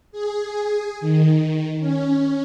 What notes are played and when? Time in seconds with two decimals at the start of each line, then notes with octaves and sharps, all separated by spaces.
0.12 G#4
1.00 D#3
1.79 C#4